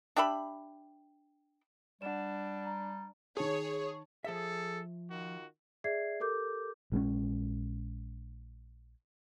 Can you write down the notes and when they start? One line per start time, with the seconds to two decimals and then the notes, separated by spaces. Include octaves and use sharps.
0.16 D4 G4 E5 B5
2.02 G3 D4 F#5 E7
2.65 A#5
3.37 D#3 G#4 C#5 A5
4.24 F3 G#4 A4 E5
5.10 D#3 F4 F#4
5.84 G#4 D5 E5 G#6 C7
6.20 G4 A4 A#4 D6 G6
6.92 A#1 G#3 C4 C#4